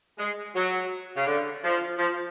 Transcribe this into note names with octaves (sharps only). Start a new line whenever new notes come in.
G#3
F#3
C#3
D3
F3
F3